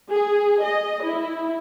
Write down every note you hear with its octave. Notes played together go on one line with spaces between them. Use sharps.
G#4
D#5
E4